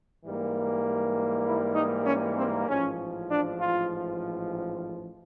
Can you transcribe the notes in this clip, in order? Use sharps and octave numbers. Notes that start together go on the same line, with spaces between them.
G#2 E3 G3 A#3
E4
D#4
C#4
C4
A1 G#2 F3 C#4
D4
F4